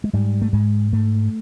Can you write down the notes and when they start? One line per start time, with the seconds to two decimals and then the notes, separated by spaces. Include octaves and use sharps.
0.04 G#3
0.13 G#2 G3
0.42 A3
0.53 G#2 G#3
0.92 G#2 A3